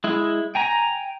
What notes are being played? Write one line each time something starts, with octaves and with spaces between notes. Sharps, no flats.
G#3 E4
G5 G#5 A#5